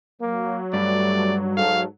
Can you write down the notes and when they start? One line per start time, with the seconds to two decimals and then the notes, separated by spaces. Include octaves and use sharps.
0.21 F#3 A#3
0.73 G2 G3 A3 D5
1.57 G#2 A4 F5